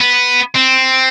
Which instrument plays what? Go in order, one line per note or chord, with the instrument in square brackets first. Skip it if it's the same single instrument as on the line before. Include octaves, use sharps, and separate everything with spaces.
[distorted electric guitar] B3
C4